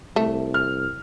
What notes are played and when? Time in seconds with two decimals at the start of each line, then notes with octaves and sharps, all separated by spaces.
0.16 C2 A3
0.54 F6